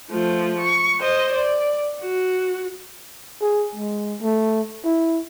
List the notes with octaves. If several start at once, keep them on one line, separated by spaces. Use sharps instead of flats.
F3 A3
C#6
C5 D#5
D5
F#4
G#4
G#3
A3
E4